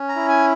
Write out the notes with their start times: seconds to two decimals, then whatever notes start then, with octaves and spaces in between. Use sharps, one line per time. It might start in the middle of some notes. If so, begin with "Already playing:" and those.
Already playing: C#4
0.09 A#5
0.16 E4
0.28 G#5